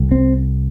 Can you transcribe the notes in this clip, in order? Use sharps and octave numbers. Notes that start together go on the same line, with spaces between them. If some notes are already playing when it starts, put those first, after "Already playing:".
Already playing: C2
C4